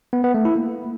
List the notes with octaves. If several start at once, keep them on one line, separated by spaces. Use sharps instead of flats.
B3
B3
A3
E4
A#3